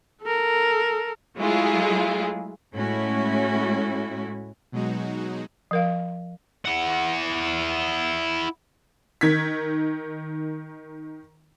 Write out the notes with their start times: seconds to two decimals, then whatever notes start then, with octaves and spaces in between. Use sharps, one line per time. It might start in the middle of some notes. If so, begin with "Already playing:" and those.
0.23 A4 A#4
1.37 F#3 G#3 A3 E4 F4 G#4
2.73 A2 G#3 A3 C#4 E4 F#4
4.72 B2 F#3 G#3 D#4 F#4
5.71 F3 A#4 F5
6.65 E4 F#5
9.21 D#3 G#6 B6